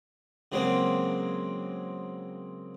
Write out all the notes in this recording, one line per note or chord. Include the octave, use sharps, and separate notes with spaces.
C#3 F#3 G#3 A#3 C4 C#4